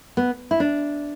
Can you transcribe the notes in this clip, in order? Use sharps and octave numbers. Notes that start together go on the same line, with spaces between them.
B3
E4
D4